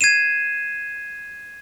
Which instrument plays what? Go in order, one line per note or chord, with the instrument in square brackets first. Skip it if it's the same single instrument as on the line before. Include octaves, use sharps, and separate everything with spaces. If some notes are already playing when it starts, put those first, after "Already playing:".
[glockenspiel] G#6 C7 D#7 E7